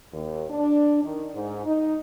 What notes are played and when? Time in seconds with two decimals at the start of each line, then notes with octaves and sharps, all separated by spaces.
0.14 D#2
0.51 D4
1.04 D#3
1.35 G#2
1.66 D#4